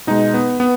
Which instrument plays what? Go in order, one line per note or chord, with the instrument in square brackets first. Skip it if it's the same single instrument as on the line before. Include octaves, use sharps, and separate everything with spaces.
[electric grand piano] B2 G#3 D#4
B3
B3